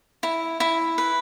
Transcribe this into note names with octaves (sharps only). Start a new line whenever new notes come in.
E4
E4
B4